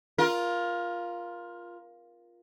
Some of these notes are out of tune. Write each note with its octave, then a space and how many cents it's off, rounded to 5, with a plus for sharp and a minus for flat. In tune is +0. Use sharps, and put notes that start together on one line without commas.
F4 +0 A#4 +20